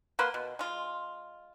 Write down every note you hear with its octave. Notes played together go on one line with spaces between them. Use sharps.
A#3 B4 F#5 C6
B2
G#3 F4